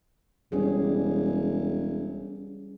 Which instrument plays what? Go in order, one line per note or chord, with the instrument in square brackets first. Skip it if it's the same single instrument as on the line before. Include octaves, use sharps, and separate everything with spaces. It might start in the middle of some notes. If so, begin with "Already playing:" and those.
[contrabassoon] E1 [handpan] G3 C#4 G#4